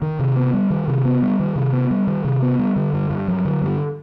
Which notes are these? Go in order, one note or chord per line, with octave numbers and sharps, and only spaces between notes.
D#3
C3
B3
G3
D#3
C3
B3
G3
D#3
C3
B3
G3
D#3
C3
B3
G3
D3
G2
G2
F#3
D3
G2